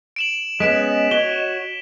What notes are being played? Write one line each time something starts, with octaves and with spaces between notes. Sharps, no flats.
D7 E7 F#7
G#3 B3 C#4 D#5 B6 D7 E7
F#4 C#5 G7